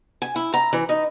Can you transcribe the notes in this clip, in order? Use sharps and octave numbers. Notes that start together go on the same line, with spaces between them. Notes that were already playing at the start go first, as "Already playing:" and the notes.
G#5
E4
A#5
E3
D#4